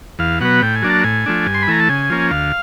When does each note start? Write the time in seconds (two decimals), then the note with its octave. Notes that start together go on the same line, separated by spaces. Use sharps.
0.19 E2 F5
0.40 B2 F#3 B3 F#5
0.62 A2 G5
0.76 G#5
0.82 F#3 A#3 D4
0.90 A5
1.04 A2 G#5
1.26 F3 A3 D4
1.46 G2
1.54 C6
1.62 B5
1.67 E3 A3 A#5
1.80 A5
1.89 C#3 G#5
2.10 F3 A#3 C#4
2.31 D2 F5